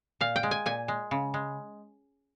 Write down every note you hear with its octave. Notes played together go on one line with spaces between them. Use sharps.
A#2 F5
G5
G#3
G#5
A#2 G#5
G#3
C#3
G#3